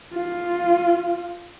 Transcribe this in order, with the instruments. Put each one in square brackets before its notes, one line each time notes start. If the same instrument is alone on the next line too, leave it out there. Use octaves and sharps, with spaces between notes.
[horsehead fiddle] F4